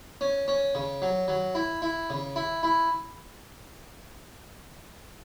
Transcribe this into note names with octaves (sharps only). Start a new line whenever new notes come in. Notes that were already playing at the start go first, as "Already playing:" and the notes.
C#4
C#4
C#3
F#3
F#3
E4
E4
C#3
E4
E4